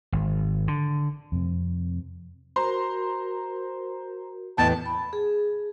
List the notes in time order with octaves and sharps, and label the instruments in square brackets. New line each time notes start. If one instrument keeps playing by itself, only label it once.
[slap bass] G#1
D3
[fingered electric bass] F2 C3
[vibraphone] F#4 A#4 [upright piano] C5 A#5 C6
[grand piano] E2 A2 [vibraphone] B4 [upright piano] D#5 G5 [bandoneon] A5
[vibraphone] B5
G#4